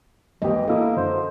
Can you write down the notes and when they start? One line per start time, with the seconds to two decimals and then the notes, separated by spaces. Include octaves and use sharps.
0.42 G#1 D#2 E3 G4 D#5
0.68 A#3 B3 E4 A4 D#5
0.96 F#2 D3 C5